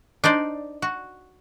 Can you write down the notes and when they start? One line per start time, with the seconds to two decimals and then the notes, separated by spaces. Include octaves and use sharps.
0.24 D4 D#4 C5 D5
0.82 F#4